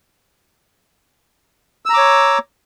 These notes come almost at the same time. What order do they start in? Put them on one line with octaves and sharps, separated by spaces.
E6 A#5 D6 C#5